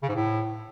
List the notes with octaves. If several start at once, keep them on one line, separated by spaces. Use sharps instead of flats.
C#3
G#2
A2